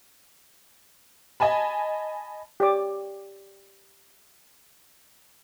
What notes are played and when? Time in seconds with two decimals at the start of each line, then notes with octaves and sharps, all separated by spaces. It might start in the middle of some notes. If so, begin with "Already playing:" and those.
1.40 D#5 G#5 A5 B5
2.60 G4 C#5 D5 D6